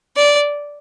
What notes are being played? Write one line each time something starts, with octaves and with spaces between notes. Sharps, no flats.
D5